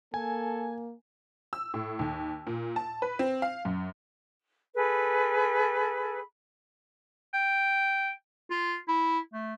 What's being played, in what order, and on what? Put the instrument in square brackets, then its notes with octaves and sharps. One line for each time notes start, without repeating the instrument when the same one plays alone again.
[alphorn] A#3 [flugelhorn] A4 [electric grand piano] G#5
[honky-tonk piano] E6
A2
D#2
A#2
A5
B4
C4
F5
F#2
[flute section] G#4 A4 B4 B5
[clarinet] G5
F4
E4
A3